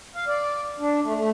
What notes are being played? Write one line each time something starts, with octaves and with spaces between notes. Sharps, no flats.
F5
D5
D4
A3
A3